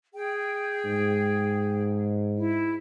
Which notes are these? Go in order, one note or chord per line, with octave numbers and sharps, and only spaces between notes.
G#4 G5
G#2
E4